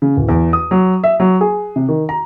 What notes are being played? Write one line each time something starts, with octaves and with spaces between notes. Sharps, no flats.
C#3
D1
E2
D#6
F#3
E5
F#3
G#4
C3
D#3
A#5